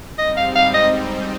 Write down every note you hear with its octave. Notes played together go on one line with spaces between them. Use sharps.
G#2 G3 C4 D#4 D#5
F5
F5
D#5